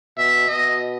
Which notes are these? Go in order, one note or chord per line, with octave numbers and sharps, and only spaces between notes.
B2 E5
B2 D#5